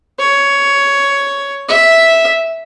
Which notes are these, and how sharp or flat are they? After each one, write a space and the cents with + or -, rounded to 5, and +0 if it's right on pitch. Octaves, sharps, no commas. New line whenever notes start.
C#5 +10
E5 -5